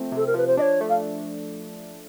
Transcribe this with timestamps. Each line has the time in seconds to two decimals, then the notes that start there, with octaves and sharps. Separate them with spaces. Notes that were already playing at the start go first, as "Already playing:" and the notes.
Already playing: F3 A3 C4
0.12 C3 A4
0.27 A#4
0.34 F3 B4
0.47 C5
0.57 D4 D#5
0.61 C#5
0.81 A3
0.89 F5